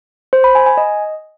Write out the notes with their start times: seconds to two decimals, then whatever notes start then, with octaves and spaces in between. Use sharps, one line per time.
0.33 C5
0.44 B5
0.55 G#5
0.66 G#5
0.77 D#5